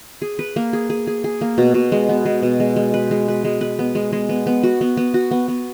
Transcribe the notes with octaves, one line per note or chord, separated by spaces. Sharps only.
G#4
B4
A#3
G#4
G#4
G#4
G#4
A#3
B2
B2
G#3
B3
G#3
B2
G#3
G#3
B4
G#3
B4
G#3
B4
B3
G#3
G#3
B3
B3
F#4
B3
B3
F#4
B3
B3